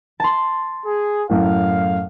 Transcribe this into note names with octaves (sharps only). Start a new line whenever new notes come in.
A5 C6
G#4
F#2 A2 F5